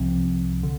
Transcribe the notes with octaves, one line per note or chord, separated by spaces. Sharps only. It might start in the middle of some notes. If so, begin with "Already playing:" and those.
Already playing: C2 C3 F3 C4
D3